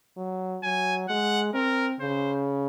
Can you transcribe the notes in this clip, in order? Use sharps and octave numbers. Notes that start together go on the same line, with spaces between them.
F#3
F#3 G#5
G#3 F#5
C4 A#4
C#3 C5